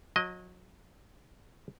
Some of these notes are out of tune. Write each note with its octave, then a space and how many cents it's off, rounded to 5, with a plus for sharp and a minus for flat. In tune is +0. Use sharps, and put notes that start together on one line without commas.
F#3 -30 D#5 +0